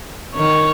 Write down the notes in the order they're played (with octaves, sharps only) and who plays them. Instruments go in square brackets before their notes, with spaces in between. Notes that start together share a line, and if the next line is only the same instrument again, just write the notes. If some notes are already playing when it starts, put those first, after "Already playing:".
[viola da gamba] D#3 [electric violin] C#5